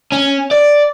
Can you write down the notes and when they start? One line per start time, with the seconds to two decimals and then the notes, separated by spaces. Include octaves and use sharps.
0.12 C#4
0.51 D5